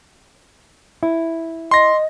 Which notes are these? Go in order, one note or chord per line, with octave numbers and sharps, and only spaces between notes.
E4
D#5 C6 A#6